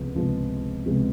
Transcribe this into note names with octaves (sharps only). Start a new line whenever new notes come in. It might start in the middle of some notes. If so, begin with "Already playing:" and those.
Already playing: C#2 C3 F3 G#3 B3
C#2 C3 F3 G#3 B3
C#2 C3 F3 G#3 B3